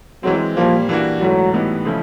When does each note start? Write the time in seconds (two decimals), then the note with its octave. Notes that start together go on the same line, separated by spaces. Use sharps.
0.23 E3 F#3 G#3 C4
0.56 A#2 F3 G3 A#3
0.89 E3 G3 A#3 D4 F#4
1.21 G#2 E3 F#3 A3
1.53 A2 E3 G3 B3 D#4
1.85 C#3 F3 A3 C#4 E4